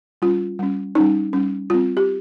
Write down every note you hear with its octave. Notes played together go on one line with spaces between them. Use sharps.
G3 C#4 F4
G3 C#4
G3 C#4 D#4
G3 C#4
G3 C4 F4
G4